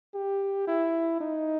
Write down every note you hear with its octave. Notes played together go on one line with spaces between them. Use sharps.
G4
E4
D#4